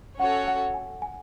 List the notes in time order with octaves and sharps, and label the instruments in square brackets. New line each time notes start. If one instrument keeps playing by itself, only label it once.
[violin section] C#4 F#4 A4 C#5 [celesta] F#5
[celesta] F#5
G#5
G#5